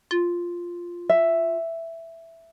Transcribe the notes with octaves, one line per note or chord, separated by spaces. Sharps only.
F4
E5